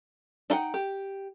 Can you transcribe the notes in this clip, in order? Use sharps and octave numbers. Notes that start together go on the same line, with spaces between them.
D4 D#4 F#5 G5
G4